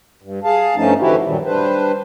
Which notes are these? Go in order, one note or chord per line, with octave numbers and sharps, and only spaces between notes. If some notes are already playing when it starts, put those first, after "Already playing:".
G2
G#4 F5 A5
G2 F3 A3 C#4 D#4 A5
D3 E3 F3 E4 F#4 G4
G2 A#2 D#3 F#3 G3
G3 D4 B4 C5